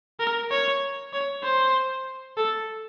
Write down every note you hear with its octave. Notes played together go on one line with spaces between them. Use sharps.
A#4
C#5
C#5
C5
A4